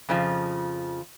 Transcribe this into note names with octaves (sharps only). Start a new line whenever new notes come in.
F2 C#3 F3